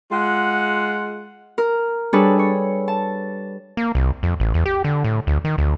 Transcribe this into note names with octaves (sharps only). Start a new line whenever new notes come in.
G#3 F4 F#5
A#4
G3 D4 G#4 A4 B4 C#5
C#5
A5
A#3
C2
F2
A1
E2
G4
D3
A2
D2
D#3
D2